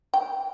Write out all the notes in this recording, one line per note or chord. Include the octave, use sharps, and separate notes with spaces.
G5